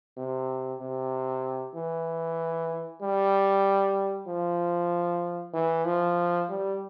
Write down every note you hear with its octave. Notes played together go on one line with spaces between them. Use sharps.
C3
C3
E3
G3
F3
E3
F3
G3